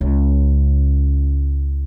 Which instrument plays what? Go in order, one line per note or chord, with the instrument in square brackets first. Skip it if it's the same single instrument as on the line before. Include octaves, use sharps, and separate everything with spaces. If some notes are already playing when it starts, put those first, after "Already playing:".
[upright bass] C#2 C#3